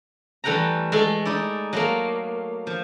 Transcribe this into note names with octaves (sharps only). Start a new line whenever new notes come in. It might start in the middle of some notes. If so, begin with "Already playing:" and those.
E3 G3 A3 F#5 G5 A#5
G#3 A3 A4
D#4 E4 D5
F#3 A3 A#3
F3